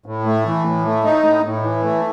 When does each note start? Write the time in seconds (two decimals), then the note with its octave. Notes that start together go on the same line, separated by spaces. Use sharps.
0.06 A2
0.25 A3
0.46 E3
0.65 A2
0.85 A3
1.04 D#4
1.24 A2
1.44 A2
1.63 E3
1.83 A3